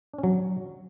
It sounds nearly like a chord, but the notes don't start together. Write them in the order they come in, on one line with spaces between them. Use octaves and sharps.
D4 C#4 F#3